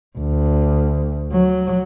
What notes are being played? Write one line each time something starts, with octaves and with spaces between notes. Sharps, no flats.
D2
F#3